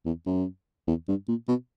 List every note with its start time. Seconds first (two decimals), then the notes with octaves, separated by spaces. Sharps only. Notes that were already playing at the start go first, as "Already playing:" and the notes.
0.05 E2
0.26 F#2
0.87 E2
1.08 G2
1.28 A#2
1.48 B2